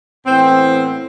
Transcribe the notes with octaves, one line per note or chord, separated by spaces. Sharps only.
A2 E3 B3 C4